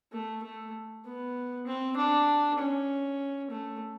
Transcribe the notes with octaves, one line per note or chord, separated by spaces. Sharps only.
A3
A3
B3
C4
D4
C#4
A3